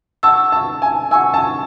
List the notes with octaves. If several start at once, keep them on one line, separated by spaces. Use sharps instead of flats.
F#5 A5 C#6 E6
A5
G#5
F#5 G#5 C#6 E6
A5